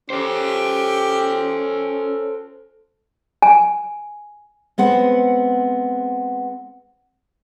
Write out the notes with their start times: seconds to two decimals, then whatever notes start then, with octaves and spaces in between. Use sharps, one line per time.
0.10 C#4 G4 A4 C5
3.42 G#5
4.78 G#3 B3 C4 F#5